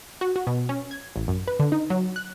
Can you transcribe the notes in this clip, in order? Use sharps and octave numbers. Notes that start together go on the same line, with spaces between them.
F#4
F#4
B2
C#4
G#6
A1
F#2
B4
D3
D#4
F#3
F#6